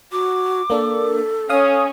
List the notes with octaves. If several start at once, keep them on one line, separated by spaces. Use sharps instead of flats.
F#4 D6
A#3 D4 A4
C#4 C#5 F5 D#6